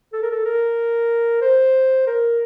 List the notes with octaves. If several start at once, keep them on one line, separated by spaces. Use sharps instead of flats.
A4
A#4
A4
A#4
C5
A#4